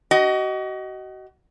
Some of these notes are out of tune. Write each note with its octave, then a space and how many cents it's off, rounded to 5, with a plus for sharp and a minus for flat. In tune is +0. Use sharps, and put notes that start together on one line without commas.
F#4 +35 D#5 +5